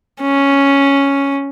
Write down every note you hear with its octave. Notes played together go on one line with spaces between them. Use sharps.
C#4